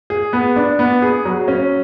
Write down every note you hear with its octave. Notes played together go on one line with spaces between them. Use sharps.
G#4
B3
D4
B3
G#4
F#3
C#4